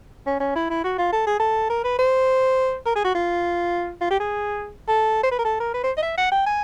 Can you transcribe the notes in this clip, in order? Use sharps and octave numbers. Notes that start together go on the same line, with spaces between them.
C#4
C#4
E4
E4
F#4
F4
A4
G#4
A4
A#4
B4
C5
A#4
G#4
F#4
F4
F4
G4
G#4
A4
C5
B4
A#4
A4
A#4
B4
C5
D#5
E5
F#5
G5
G#5